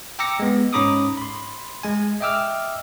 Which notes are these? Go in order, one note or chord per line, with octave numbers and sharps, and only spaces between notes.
G5 A#5 D6 E6 A#6 C#7
G#3 B3
G#2 C#4 A#5 B5 D6 D#6
B5 C6
G#3 G#5
D#5 E5 G5 D6 E6 F6